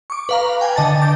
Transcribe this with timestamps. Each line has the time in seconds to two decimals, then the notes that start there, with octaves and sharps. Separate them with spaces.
0.10 C#6 D6
0.29 B4 F5 A#5
0.61 G5 G#5
0.76 D3 D#5 A5 A6
1.01 D6 G6 A6